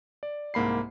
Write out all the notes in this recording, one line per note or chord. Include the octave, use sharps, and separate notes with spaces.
D5
C2 G#2 A#3 B5 C7